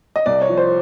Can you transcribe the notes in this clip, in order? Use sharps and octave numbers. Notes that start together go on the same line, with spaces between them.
D#5
C2 D5
C#5
F3
C5